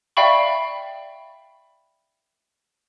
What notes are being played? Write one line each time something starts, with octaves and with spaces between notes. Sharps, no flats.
D5 E5 F5 G5 B5 C#6